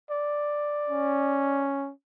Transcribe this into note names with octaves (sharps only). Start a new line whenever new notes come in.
D5
C#4